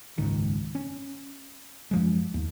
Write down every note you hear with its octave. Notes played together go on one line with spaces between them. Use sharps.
F#1 C#2 G#2 D#3
C#4
F#2 F3 G#3
D#2